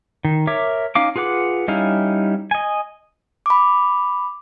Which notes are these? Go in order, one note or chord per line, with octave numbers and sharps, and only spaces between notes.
D#3
A#4 C#5 E5 D6
C#4 D#4 F5 D6
F4 G#4 B4 F#5 D6
G3 C#4 D#4 E4 F5
D#5 G#5
B5 D6